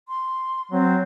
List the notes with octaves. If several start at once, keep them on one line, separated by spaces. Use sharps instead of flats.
C6
F#3 C4